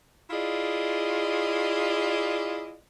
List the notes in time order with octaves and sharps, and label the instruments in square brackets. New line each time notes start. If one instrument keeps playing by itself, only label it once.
[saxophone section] E4 F4 G#4 D5 D#5